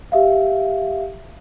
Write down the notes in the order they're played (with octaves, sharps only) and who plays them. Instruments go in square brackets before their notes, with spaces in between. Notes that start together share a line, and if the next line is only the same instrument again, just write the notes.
[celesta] G4 E5 F5